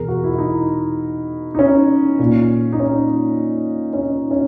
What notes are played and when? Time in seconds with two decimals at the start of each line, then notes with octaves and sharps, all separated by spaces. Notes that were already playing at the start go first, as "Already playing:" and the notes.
Already playing: E2 B2 G#4 A#4
0.08 F#4
0.24 E4
0.34 E4
0.38 D#4
1.55 D#4
1.59 C#4
2.19 A#2
2.73 D#4
2.80 C#4
3.93 C#4
4.01 D#4
4.31 C#4